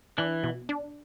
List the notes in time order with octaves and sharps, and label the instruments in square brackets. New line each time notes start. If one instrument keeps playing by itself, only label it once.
[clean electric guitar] E3 [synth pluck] D4
[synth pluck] B2
D4